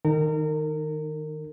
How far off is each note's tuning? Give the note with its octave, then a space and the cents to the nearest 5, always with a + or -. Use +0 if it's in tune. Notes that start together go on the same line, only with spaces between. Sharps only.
D#3 +0 D#4 -45 A#4 -30